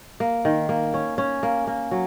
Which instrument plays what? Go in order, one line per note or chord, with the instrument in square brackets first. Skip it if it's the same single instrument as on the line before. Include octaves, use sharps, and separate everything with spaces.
[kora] A#3
D#3
A#3
C#4
C#4
A#3
A#3
F#3